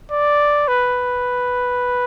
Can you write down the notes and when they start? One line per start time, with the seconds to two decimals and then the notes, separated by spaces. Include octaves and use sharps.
0.11 D5
0.68 B4